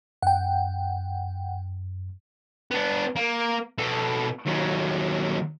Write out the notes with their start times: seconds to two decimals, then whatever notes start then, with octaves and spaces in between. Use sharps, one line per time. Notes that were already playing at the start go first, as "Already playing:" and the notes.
0.22 F#2 F#5 G5
2.71 B3 D4
3.16 A#3
3.78 B2 A4
4.46 D#2 F#3